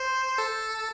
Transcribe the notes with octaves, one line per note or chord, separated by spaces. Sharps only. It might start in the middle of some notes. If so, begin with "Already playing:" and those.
Already playing: C5
A4